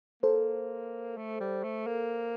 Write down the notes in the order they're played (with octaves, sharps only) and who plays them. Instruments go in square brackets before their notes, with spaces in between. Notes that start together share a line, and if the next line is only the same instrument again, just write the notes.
[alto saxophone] A#3 [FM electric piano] A4 C5
[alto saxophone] A3
G3
A3
A#3